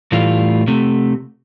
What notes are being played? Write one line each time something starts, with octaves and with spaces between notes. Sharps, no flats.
A2 E3 G3 A3 F4
C3 A3